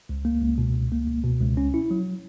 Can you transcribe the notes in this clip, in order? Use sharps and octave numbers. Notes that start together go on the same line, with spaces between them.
C#2
A#3
C#2
B2
C#2
A#3
C#2
B2
C#2
C#4
E4
F#3